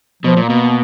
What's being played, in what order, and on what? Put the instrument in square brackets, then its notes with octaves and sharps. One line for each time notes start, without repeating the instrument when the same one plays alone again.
[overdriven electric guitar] B2 [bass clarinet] F3
[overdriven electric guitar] A#2
[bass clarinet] A#3
[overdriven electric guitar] B2